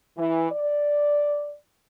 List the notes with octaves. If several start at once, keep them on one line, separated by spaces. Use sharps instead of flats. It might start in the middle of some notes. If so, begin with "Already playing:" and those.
E3
D5